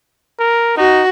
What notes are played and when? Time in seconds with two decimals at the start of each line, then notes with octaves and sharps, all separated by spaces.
0.39 A#4
0.77 D#4 F#4